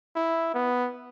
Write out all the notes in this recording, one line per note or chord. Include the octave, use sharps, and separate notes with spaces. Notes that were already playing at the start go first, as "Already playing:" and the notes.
E4
B3